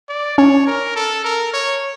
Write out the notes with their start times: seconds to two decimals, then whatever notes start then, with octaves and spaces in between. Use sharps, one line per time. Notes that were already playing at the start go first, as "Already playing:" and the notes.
0.09 D5
0.38 C#4 C#5
0.67 A#4
0.96 A4
1.24 A#4
1.53 C#5